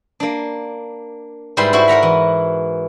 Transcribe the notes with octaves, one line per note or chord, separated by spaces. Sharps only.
A#3 D4
G#2 G3 E4 B4 C6
E4 F#4 C5
A#4 F#5 A#5 B5
E3